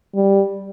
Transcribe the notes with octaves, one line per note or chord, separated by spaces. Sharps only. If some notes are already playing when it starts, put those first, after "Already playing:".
G3